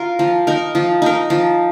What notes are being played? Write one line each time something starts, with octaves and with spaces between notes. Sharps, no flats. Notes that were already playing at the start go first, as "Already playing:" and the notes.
Already playing: F4 A#4
F3
D#4 A#4
F3
D#4 A#4
F3